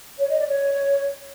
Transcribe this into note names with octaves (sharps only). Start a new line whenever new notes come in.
C#5
D#5
D5
C#5